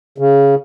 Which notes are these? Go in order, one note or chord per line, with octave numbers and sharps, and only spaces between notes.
C#3